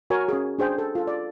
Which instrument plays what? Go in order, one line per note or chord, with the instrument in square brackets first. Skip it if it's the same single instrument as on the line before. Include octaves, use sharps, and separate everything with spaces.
[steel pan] F#4 A#4 C#5 G#5
C#4 G#4
D4 G#4 C5 G5
A4
F4 A4
D5